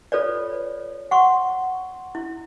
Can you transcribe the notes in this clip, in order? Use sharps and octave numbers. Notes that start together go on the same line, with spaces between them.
F4 A4 B4 C#5 D5
F#5 C6 C#6
E4